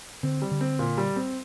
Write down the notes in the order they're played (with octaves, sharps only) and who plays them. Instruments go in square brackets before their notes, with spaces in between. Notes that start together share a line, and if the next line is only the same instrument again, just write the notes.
[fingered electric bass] D3 [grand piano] C4
[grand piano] G3
[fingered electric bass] D3
[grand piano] C4
A#2
G3
C4